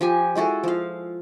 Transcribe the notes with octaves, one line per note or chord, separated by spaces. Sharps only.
F3 G4 G#5
G#3 E4 F#4 A4
F3 F5